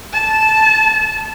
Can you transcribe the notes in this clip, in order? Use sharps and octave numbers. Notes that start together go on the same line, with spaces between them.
A5